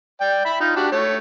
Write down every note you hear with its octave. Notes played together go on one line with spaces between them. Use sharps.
D5 G5
E5 B5
D#4 F4
D4 F#4 G4
A3 C#5